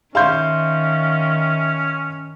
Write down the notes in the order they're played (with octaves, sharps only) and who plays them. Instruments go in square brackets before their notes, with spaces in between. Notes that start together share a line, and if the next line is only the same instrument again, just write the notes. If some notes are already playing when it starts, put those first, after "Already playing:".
[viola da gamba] D#3 [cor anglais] C#4 [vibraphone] E5 [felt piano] F5 C6 G6